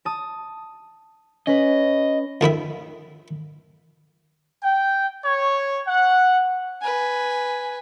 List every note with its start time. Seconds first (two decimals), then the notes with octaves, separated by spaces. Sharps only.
0.05 A5 D#6
1.47 C#4 B4 D#5
2.41 F2 D#3 E4 E5
4.63 G5
5.24 C#5
5.88 F#5
6.81 B4 G#5